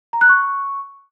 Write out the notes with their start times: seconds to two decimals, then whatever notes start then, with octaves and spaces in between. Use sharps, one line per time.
0.13 A#5
0.21 F#6
0.29 C#6